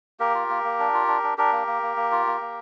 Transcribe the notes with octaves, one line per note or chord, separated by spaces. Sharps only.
A#3 G4 A#4
F4
A#3
A#3
D4
F4
D4
D4
D4 G4 A#4
A#3
A#3
A#3
A#3
F4
A#3
A#3